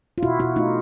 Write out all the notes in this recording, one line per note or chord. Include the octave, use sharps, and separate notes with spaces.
F4
B2 E4 F#4
B2 E4 F#4
A3 D#4 F4